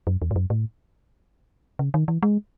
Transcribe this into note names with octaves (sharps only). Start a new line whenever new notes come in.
F#2
E2
G#2
F#2
A2
C#3
D#3
E3
G#3